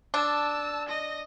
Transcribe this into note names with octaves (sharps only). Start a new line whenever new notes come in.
D4 A5 E6
D#5 A#6